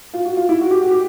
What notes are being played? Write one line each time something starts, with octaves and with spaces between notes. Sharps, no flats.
F4
F#4
F4
E4
F#4
G4
F#4
G4